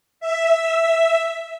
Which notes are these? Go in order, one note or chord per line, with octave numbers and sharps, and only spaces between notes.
E5